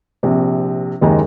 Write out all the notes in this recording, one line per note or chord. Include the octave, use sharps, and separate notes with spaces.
A#1 C3
F#1 D#2 D#3 G#3 G#4 A#5